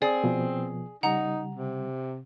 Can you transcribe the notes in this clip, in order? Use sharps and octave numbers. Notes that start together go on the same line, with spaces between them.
C4 G#4 D5
B2 F3 B3
C#3 G3 D#4 F#5 A#5
C3